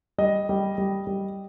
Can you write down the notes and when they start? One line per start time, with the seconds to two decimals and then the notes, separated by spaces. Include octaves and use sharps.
0.18 G3 D#5
0.49 G3
0.78 G3
1.07 G3